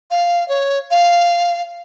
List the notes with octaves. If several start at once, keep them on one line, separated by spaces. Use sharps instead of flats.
F5
C#5
F5